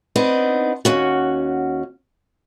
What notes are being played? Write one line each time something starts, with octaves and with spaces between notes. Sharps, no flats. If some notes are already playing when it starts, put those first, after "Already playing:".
B3 C4 D4 D#4
D#2 C#4 F#4